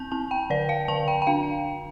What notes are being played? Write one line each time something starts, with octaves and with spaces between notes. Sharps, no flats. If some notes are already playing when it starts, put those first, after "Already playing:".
Already playing: C4 A5 G6
C4 A5
G5
D3 D5
F5
D3 A5
G5
G5
D4 F5